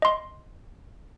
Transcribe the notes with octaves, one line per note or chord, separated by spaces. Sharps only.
D#5 C6